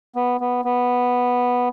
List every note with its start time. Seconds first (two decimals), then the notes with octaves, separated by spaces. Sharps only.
0.16 B3
0.41 B3
0.65 B3